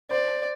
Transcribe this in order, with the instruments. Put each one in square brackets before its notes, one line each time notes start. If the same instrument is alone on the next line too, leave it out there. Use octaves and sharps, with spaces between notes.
[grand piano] C5 [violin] D5